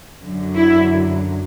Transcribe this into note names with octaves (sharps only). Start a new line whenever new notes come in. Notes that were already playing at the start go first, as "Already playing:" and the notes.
F#2 D3 F#3
E4